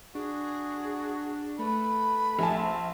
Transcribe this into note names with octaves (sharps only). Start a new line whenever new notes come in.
D4 F#4 G#4
A3 B4 B5
A#1 G#5 A5
C4